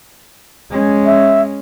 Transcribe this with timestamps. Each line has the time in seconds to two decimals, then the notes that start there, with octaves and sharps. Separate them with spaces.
0.71 G#3 C#4
1.06 E5